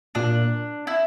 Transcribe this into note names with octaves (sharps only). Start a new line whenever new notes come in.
A#2 D4
E4